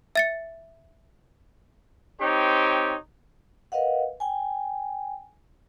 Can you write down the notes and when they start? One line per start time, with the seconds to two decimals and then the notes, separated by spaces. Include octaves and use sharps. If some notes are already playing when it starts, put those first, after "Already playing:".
0.15 E5 A6 C#7
2.21 C4 D#4 G4 C#5
3.72 A#4 B4 D#5 F5 F#5
4.20 G5 G#5